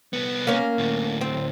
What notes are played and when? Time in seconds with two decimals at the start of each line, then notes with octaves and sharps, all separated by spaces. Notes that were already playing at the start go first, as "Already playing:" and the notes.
0.13 C2 B3
0.47 A#3 C#4
0.78 D2 A2
1.21 C4